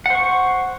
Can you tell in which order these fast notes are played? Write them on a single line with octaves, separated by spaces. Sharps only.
F#5 C5 C#6